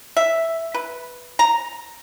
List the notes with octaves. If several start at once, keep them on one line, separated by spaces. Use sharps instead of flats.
E5
B4
A#5